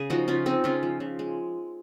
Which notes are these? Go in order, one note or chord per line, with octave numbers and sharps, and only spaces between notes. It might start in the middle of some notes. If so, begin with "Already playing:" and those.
Already playing: C#3 G#4
F3 D#4 F#4
C#3 C#4 F4
G#3 C4 D#4
C#3 C#4 F4
F3
C#3
G#3